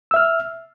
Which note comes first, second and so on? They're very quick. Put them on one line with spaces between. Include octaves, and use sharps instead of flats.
E6 E5 F6